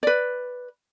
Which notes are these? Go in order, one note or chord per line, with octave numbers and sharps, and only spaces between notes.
B4 D5